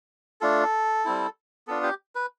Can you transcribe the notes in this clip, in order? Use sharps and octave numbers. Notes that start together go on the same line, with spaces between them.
A3 D4 F4 A4
G3 C4 E4
B3 D4 F4 A4
G4
B4